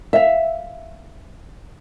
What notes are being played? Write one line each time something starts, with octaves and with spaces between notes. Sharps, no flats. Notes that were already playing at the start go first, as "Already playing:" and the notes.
E5 F5